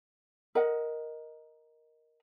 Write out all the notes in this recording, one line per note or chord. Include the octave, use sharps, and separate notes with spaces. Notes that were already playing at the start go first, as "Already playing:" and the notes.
A#4 D#5 F#5